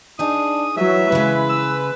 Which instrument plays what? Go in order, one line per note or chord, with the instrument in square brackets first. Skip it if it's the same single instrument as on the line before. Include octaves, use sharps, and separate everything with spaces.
[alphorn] D4 [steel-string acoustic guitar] D#4 G#4 [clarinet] D#6
[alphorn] E3 [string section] F#3 [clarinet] E5
[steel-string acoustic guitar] C#3 G#3 [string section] B4
[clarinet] E6